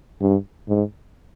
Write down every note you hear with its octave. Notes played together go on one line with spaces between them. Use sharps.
G2
G#2